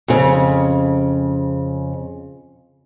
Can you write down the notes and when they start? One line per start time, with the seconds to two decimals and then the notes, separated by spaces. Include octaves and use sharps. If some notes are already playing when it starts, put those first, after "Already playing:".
0.08 F2 C#3